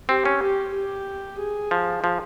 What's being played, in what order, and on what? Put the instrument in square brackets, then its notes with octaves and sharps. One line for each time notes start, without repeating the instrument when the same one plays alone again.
[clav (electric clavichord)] C4 [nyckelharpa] G4
[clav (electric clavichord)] C#4
[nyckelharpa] G4
G4
G#4
[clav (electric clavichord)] F3
F3